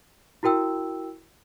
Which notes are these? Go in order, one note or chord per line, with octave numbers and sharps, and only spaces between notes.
E4 F#4 A#4 G5 E6